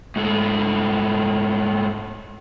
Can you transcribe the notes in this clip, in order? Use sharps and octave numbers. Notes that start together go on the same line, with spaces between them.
G#2 A3